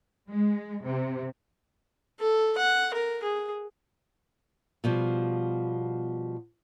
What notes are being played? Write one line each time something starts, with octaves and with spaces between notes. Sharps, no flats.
G#3
C3
A4
F#5
A#4
G#4
B2 F3 G3